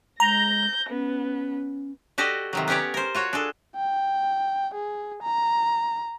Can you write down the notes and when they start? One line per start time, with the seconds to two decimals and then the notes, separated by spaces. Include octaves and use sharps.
0.20 G#3 A#5 G6 A#6
0.90 B3 C#4
2.18 F#4 G4 A4 D5 D#5
2.53 C3 D#3 F#3
2.68 B3 C#4 G4 C#5 D5
2.94 A#4 C5
3.15 F4 F#4 C#5
3.33 D4 G#4 A4
3.76 G5
4.74 G#4
5.23 A#5